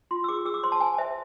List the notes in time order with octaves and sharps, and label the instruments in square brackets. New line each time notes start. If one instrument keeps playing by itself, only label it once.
[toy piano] F4 C6
E6
G#4 D6
G#4 E6
D6
C5 C6
A5
C5 G#5
C5 E5